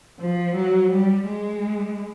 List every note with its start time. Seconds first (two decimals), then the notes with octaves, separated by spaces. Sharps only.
0.20 F3
0.55 F#3
0.91 G3
1.26 G#3